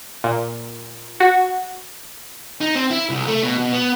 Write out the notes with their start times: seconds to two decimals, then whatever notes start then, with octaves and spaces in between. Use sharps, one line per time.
0.24 A#2
1.20 F#4
2.61 D#4
2.75 C4
2.90 E4
3.09 C2
3.27 A3
3.43 B2
3.58 B2
3.72 B3